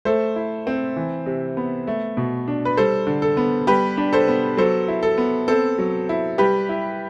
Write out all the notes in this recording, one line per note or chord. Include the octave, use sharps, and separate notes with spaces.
A3 A4 C5
E4
C4
E3
C3
B3
A3
B2
D4
B4
G3 A4 C5
D3
A4
B3
G3 G4 B4
D4
A4 C5
B3
F#3 A4 C5
E4
A4
B3
C4 A4
F#3
E4
G3 G4 B4
E4